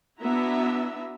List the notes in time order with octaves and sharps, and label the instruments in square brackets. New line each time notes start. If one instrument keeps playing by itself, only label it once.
[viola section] B3 D4 E4 F#4 E5 A#5